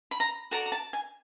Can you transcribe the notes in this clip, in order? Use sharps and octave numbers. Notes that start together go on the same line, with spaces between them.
B5
A#5
F#4 A4 D5 A#5
A#5
A5
G#5